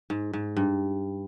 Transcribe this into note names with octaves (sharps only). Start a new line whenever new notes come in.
G#2
G#2
G2